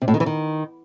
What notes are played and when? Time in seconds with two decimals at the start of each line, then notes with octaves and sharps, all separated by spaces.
0.02 C3
0.08 A2
0.14 D#3
0.20 E3
0.26 D#3